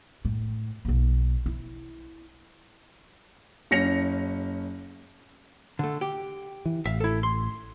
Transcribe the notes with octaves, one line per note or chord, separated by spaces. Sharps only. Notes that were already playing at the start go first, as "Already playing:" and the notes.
A2
B1 A#3
E4
F#1 C#4 A#6 C#7 F7
D3 A3
G4
E3
A1 E5 F5
E4 A4
C6